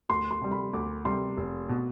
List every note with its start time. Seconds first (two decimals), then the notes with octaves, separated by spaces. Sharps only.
0.09 D2 C6
0.31 C6
0.41 C3 G3
0.51 B5
0.73 D2 D6
1.05 C3 G3 C6
1.37 F1
1.69 B2